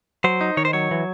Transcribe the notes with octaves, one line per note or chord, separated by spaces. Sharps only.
F#3 C5
D#4
D#3 C#5
C5
F#3 C#5
E3